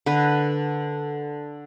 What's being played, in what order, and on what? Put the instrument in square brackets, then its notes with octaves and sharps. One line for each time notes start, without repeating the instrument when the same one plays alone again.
[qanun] D3 B4